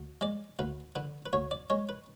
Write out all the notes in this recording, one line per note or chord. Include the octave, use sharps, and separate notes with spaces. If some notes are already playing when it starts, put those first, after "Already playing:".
Already playing: D2
G#3 D5
D2 B4
D3 B4
B4
D2 C#5
D5
G#3 C#5
B4